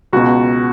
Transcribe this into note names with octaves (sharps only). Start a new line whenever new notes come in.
C#2 B2 F#4